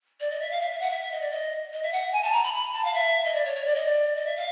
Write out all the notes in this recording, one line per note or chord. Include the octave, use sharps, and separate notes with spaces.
D5
D#5
E5
F5
E5
E5
F#5
E5
E5
D#5
D5
D#5
D#5
E5
F#5
G#5
A5
A#5
B5
B5
A5
F5
E5
D#5
D5
C#5
C#5
D5
D#5
D5
D#5
E5
F5